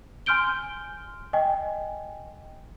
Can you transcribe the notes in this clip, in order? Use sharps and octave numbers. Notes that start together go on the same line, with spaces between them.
G#5 C6 F6 G6 D7 G7
D#5 G5 G#5